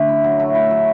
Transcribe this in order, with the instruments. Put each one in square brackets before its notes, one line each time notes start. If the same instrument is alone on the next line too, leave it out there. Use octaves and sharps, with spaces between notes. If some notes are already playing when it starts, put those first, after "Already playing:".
Already playing: [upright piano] D3 [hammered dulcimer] A3
[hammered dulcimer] E4
F#3
A3
E4
F#3